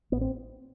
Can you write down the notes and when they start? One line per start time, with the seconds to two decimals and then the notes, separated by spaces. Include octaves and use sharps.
0.12 A1 B3
0.21 C4